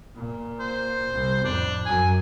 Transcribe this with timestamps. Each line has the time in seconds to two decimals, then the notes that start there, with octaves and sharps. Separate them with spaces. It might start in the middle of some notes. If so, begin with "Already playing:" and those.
0.16 A#2
0.60 C5
1.13 C2
1.45 F2 A2 D4
1.86 F#2 F#3 G#5